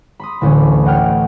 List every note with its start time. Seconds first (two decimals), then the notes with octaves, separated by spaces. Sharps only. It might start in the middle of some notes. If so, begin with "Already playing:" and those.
0.20 B5 C6 D#6
0.41 A1 D2 C#4
0.85 D#5 F#5 G5 F6